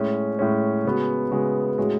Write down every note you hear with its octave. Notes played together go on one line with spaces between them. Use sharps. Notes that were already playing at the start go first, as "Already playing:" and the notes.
Already playing: A2 G#3 C#4
A2 G#3 C#4
C#3 G#3 B3 F#4
C#3 G#3 B3 F#4
A2 G#3 C#4 F#4